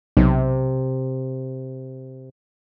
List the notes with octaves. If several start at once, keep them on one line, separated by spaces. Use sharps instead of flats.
B1 C3